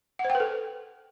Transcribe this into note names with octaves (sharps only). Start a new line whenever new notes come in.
F#5
C5
G5
B4
A4